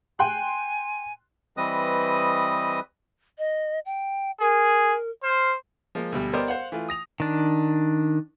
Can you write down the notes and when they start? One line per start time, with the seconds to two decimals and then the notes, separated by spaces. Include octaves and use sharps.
0.19 G5 G#5 C6 F#6
1.57 E3 G3 C4 B4 D#5 D#6
3.38 D#5
3.86 G5
4.40 G#4 A#4
5.23 C5 F6
5.95 F3 G#3 A#3
6.12 D2 B2 G3
6.33 B3 G4 A#4 C5 D5 D#5
6.48 C5 F5 F#5
6.72 E3 A3 F4
6.89 D#6 A#6 F7
7.20 D#3 D4